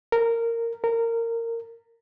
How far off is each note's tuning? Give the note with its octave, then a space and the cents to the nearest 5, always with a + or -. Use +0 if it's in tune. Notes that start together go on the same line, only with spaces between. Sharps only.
A#4 -15
A#4 -20